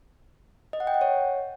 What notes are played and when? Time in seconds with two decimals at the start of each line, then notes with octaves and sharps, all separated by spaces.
0.73 D#5
0.80 F#5
0.87 G5
0.94 F#5
1.01 C#5